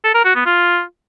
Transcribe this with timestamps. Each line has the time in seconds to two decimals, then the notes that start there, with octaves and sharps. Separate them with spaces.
0.04 A4
0.14 A#4
0.25 F#4
0.35 B3
0.45 F4